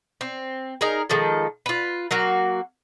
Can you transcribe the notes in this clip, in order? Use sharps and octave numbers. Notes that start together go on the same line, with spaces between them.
C4
D#4 G#4 A#4
D#3 F3 G#3 A4
F4 B4
F#3 A#3 F#4